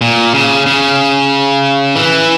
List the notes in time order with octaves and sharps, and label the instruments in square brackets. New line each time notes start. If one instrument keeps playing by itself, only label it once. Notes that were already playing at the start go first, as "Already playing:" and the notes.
[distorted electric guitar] A#2
C#3
C#3
E3